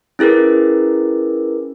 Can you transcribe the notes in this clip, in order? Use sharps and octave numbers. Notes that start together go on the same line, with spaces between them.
C#4 E4 G#4 A#4 B4